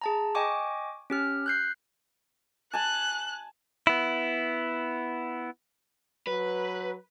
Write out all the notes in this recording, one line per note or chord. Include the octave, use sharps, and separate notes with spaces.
G#4 A5 A#5
D#5 G5 G#5 C#6 D6
C#4 G4 F6
F#6 G6 C7
G#5 A5 F#6
B3 E4
F#3 B4